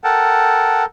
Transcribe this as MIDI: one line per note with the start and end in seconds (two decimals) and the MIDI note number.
0.04 0.86 69
0.04 0.86 70
0.04 0.83 78
0.04 0.83 79
0.04 0.83 81